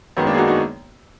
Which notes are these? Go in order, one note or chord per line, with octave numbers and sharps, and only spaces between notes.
F#2 D#3 G#3 B3
A#3 D4
G#4
D#4 F#4
D#4 F#4